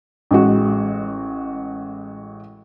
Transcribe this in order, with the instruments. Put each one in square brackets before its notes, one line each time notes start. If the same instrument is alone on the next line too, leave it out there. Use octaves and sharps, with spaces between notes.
[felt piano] A1 G#3 F#4